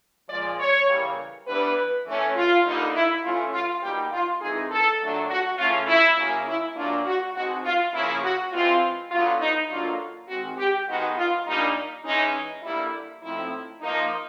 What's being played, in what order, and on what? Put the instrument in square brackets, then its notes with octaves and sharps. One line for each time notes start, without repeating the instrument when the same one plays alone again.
[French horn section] A#2 F3 G#3 D5
C#5
C#3 E3 G3 A#3
E3 G3 B3 D4 B4
E3 A3 C#4
F4
D3 G3 A#3 D#4
E4
E3 A3 C#4 F4
F4
B2 G3 A#3 D#4 G4
F4
E3 G#3 C4 D#4 G#4
A4
A#2 F#3 A3 D4
F#4
C#3 E3 A3 C#4 F4
E4
C#3 F#3 A#3 C#4
E4
A#2 F#3 A#3 D4 F4
F#4
B2 G#3 C4 D#4 F#4
F4
C#3 F3 A#3 C#4 E4
F#4
E3 G#3 C4 F4
D3 F#3 B3 F4
D#4
D3 F#3 A#3 D4 F4
D#3 G#3 C4 F#4
G4
D#3 G#3 B3 D#4 F#4
F4
A#2 G3 A#3 D4 D#4
E3 G#3 C#4 D#4
D3 G3 A#3 E4
A2 F3 A3 C4 D#4 E4
F3 A#3 D#4